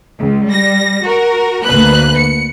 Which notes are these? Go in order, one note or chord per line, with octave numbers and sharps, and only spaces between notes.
C#2
G3 A#6
F#4 A#4
D2 A#3 B4 F#6
C#7